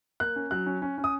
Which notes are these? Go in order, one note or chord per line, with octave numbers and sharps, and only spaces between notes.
A#3 F#6
C#4
F#3 F#6
C#4
C#4
C#4
D#6